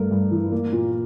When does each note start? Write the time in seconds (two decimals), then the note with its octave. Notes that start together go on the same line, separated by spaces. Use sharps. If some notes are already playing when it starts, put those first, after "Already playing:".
Already playing: G2 A3 A#4
0.11 G2
0.31 E3
0.52 A#3
0.73 A#2